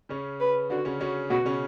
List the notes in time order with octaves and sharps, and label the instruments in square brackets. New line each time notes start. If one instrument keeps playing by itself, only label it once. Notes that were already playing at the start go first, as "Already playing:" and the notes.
[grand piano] C#3 C#4
[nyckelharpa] B4
[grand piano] D3 D4 [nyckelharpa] F#4
[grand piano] C#3 C#4
[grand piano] C#3 C#4 [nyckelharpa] F#4
[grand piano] B2 B3 [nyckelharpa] F#4
[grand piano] C#3 C#4